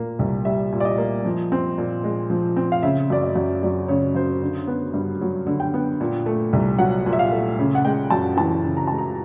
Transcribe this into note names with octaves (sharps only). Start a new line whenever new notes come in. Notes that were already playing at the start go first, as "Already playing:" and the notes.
Already playing: A#2 A#3
C2
G3 E5
A#2
D5
D#5
A#3
F3
C4
A#2
G#3
F3
C4
F5
C#3 E5
F#2 D5
D#5
F#2
F#3 D5
C#3 C#5
F#2 C5
D3
B3
G2
F#3
D3
G5
B3
A#2
A3
C2
F#3 F#5
A#2
E5
F5
A3
C#3
F#5
G#3 G5
F#2 A5
E3 A5
C#3
A#5
G#3 A5
A#5